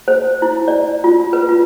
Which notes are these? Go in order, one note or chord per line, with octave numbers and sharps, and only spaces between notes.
C5
E4
D5
F4
B4
F4